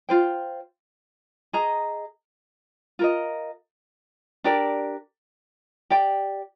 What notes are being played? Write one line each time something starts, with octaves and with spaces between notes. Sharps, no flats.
F4 C5 G5
G#4 D#5 A#5
F4 A#4 D#5
D4 G4 A#4 D5
G4 D5 G5